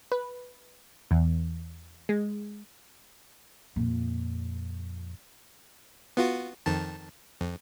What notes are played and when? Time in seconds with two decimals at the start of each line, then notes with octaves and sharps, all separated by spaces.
0.12 B4
1.11 E2
2.09 G#3
3.76 F2 A#2
6.17 B3 F4 F#4
6.66 F2 D#3 A5
7.41 F2